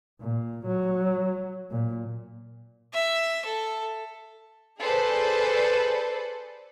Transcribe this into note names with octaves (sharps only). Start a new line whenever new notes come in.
A#2
F#3
A#2
E5
A4
G#4 A4 B4 C5 D5